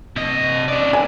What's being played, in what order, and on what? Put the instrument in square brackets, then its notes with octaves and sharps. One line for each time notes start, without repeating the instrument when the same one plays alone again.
[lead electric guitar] C3 D#5
C#4 D5
[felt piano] G#5